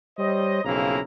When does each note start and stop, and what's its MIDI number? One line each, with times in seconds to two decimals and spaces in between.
0.19 0.64 55
0.19 0.64 72
0.19 0.64 73
0.19 0.64 75
0.65 1.00 35
0.65 1.00 41
0.65 1.00 49
0.65 1.00 58
0.65 1.00 64
0.65 1.00 82